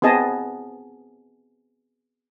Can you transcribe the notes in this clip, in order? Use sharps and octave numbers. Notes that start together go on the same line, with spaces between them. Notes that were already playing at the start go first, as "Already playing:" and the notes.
B3 C4 G#4 D#5 A5